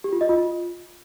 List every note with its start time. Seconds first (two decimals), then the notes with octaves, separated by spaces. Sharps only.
0.04 G4
0.13 F4
0.21 D#5
0.29 F4